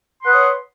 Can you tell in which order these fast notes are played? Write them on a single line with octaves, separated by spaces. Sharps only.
C6 F#5 B4 D#6 C#5